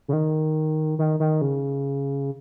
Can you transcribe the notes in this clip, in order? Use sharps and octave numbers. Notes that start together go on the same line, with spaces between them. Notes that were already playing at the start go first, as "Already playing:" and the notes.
C#3
D#3
D#3
D#3
C#3